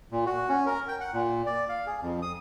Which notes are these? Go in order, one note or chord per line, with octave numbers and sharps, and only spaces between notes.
A#2
F#4
C#4
A#4
G5
F#5
A#2
D5
F5
G#4
F2
D#6